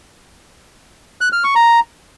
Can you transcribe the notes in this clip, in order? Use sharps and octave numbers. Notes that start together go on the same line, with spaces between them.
F#6
F6
C#6
A#5